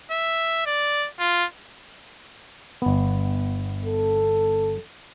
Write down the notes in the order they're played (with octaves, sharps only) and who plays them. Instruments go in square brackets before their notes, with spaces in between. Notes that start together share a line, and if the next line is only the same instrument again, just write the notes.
[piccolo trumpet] E5
D5
F4
[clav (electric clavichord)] G1 B3
[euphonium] A4